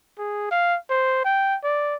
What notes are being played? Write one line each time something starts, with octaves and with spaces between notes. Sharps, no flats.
G#4
F5
C5
G5
D5